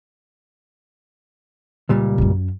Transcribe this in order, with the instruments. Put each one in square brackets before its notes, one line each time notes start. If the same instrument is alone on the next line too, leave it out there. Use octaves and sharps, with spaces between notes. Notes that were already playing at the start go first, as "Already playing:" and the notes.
[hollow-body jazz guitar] C#2 A#2 G3
[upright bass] F#2 C#4